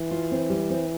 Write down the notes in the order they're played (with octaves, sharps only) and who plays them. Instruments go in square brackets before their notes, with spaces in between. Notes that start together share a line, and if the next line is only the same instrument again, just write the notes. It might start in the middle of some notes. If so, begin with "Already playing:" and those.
Already playing: [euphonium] E3
[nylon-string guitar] F4
C4
G3
C4